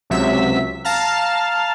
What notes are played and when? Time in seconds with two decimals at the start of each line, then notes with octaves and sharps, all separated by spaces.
0.10 C#2 C3 F#3 E5 B6
0.84 F5 A5 A#5 F6